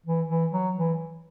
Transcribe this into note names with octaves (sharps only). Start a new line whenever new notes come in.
E3
E3
F#3
E3